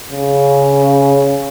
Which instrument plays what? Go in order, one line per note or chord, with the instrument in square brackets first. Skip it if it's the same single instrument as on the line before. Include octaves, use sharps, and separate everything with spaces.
[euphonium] C#3